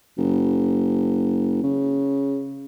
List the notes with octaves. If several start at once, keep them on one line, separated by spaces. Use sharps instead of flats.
F#1
C#3